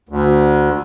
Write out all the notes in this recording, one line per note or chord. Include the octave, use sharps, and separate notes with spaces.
D2